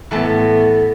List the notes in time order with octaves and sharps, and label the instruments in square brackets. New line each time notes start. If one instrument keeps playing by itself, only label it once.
[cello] A2 B3 [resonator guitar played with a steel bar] E3 A4 A5